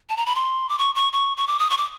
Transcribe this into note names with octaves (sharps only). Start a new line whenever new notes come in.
A5
A#5
B5
C6
D6
C#6
C#6
C#6
C#6
D6
D#6
C#6
D6